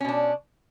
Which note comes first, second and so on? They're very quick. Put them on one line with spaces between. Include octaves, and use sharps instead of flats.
C#4 B2 D4